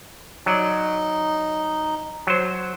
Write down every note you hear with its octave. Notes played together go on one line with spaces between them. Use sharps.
F#3 D#4 D5
F#3 C5